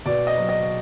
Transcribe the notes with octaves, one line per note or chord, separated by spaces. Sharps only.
B2 D5
D#5
F#3
D#5